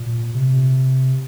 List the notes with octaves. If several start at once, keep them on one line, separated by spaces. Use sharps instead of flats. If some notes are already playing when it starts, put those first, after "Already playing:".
Already playing: A#2
C3